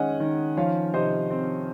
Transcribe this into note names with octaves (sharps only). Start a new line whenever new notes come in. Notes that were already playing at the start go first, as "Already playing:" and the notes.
Already playing: D#3 G#3 C#4 D#5 F#5 G#5
D#3
F3 C#5 F5
C3 C5 D#5
C4